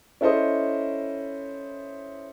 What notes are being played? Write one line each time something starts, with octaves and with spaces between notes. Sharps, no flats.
C#4 E4 A4 C5 D#5